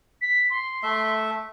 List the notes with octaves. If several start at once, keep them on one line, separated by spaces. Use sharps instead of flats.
B6
C6
A3 E5